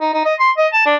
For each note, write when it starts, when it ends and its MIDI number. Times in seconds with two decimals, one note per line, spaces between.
0.01 0.11 63
0.14 0.21 63
0.25 0.34 75
0.39 0.51 84
0.58 0.67 75
0.73 0.85 81
0.86 0.96 62